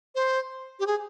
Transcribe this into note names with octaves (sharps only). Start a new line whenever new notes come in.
C5
G4
G#4